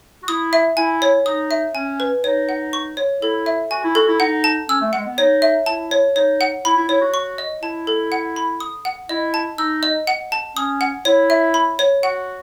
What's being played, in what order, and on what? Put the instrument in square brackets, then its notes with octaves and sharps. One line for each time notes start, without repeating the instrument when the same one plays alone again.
[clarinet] F#4
[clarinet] E4 [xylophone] D#6
[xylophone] E5
[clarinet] E4 [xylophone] G#5
[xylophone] C#5
[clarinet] D#4 [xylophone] D#6
[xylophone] E5
[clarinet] C#4 [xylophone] G#5
[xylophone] B4
[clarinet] D#4 [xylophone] C#5
[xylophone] F#5
C#6
C#5
[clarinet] E4 [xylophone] A4
[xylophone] E5
[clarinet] F#4 [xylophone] G#5
[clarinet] E4
[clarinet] F#4 [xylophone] A4
[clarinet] E4
[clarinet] D#4 [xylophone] F#5
[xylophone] A5
[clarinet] C#4 [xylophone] E6
[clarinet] A3
[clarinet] G#3 [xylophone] F#5
[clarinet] B3
[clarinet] D#4 [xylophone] C#5
[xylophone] E5
[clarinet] E4 [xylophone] A5
[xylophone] C#5
[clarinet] D#4 [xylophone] C#5
[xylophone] F#5
[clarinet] E4 [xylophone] B5
[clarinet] E4
[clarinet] E4 [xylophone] C#5
[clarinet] F#4
[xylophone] C#6
D#5
[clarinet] E4 [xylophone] A5
[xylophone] A4
F#5
B5
D#6
F#5
[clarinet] E4 [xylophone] D#5
[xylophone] A5
[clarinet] D#4 [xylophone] E6
[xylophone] D#5
F#5
A5
[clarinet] C#4 [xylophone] D#6
[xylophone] F#5
[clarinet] E4 [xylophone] C#5
[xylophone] E5
B5
C#5
[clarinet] F#4 [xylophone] F#5